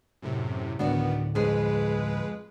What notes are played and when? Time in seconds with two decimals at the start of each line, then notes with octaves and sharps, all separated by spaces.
0.22 F#2 A2 C3
0.79 D2 A2 D#3 B3 D4 F#4 D5
1.35 F2 G#3 G#4 B4